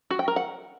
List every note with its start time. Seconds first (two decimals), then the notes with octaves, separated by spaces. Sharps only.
0.11 F#4
0.19 G5
0.28 A#4
0.36 F#5